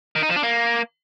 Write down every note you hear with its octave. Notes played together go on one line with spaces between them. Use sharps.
D#3
D#4
F3
D4
A#3